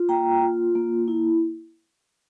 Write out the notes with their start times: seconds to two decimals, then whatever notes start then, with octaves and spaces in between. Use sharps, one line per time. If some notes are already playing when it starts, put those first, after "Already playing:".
Already playing: F4
0.09 A#3 G5 A#5
0.42 F4
0.75 A#3
1.08 E4